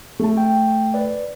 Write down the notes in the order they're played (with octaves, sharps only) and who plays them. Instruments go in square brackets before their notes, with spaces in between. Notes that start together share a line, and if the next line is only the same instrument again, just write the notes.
[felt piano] A3 A5
[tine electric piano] G5
B4 D5